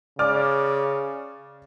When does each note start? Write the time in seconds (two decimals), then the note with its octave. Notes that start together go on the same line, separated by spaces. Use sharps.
0.19 C#3 D5 D6 F6